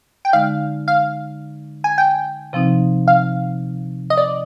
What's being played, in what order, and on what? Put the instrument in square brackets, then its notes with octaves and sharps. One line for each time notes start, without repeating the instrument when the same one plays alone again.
[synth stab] G5
[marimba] D3 G#3 D#4 [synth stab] F5
[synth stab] F5
G#5
G5
[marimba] C3 F3 C4 D#4
[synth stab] F5
D#5
D5